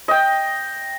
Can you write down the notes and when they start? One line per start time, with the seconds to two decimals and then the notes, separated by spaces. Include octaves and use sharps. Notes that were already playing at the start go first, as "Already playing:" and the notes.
0.08 D#5 G5